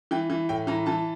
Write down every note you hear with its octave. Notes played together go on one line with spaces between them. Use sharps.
E3 G5
E3
A2 G5
E3 A#5
E3 A5